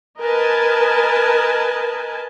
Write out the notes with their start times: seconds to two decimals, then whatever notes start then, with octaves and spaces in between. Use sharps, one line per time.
0.20 A#4 B4 D#5 G#5 A5